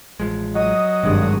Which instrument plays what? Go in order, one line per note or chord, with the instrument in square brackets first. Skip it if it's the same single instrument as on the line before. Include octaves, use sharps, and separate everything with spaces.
[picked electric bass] A1 F3 G#3
[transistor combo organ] F#3 [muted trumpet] D#5 [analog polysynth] D#6
[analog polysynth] G#1 G2 D#6 [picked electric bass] C3 G#3